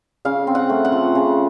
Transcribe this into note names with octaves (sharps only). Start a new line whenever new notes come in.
C#3 F5
C4
F#5
A3
F#5
F3
C#3